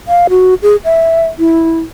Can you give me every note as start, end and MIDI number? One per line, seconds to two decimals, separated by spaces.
0.08 0.27 77
0.30 0.54 66
0.63 0.76 68
0.85 1.27 76
1.39 1.80 64